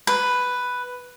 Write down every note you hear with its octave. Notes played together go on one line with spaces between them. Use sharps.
B4